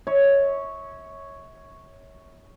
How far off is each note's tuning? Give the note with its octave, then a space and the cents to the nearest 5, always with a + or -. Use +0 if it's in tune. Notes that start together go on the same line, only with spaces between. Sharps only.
C#5 +0 E5 -35